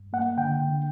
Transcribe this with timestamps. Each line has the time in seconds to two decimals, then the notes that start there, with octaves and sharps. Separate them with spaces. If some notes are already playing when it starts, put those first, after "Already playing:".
Already playing: G2
0.13 A#3 F#5
0.38 D3 G5
0.60 D3